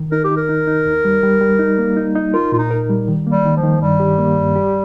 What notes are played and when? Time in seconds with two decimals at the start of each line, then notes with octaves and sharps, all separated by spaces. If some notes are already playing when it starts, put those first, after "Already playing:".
Already playing: D#3
0.12 D#4 A#4
0.24 G4
0.30 D#4
0.37 A#4
0.49 D#4
0.67 D#4
0.86 D#2
1.05 G3
1.23 G3
1.41 G3
1.59 D#4
1.79 A#3
1.97 D#4
2.15 D#4
2.34 F4 A#4
2.52 A#2 F4
2.58 D#4
2.71 A#4
2.89 G3
3.08 D#3
3.27 A#3
3.32 G3
3.45 D#3
3.57 F3
3.63 D#3
3.82 G2 G3
4.00 G4
4.18 A#3
4.37 G2
4.56 G4